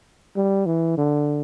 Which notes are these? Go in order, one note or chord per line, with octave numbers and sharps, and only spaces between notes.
G3
E3
D3